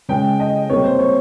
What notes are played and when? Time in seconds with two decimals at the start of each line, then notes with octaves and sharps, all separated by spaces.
0.09 C#3 G#3 G5
0.40 D#5
0.69 C3 G3 A#3 C#5
0.84 C5
0.99 C#5